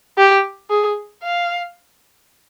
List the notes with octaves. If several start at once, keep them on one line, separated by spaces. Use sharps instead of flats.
G4
G#4
F5